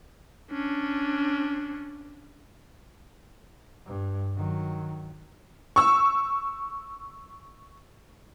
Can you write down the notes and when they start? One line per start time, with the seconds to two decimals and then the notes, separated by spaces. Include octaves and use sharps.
0.51 C#4 D4
3.86 G2
4.36 D#3 F#3
5.76 C#6 E6